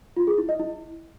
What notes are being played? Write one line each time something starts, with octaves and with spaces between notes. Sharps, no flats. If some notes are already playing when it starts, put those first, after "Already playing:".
F4
G#4
E4
D#5
E4